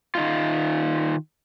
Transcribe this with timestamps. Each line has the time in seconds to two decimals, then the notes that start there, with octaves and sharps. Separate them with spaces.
0.15 D#3 D#4 F4